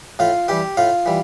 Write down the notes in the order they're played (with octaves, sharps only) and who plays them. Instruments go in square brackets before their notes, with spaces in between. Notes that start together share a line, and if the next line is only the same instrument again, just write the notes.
[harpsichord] A2 F4 F5
E3 G3 G4 G5
A2 F4 F5
E3 G3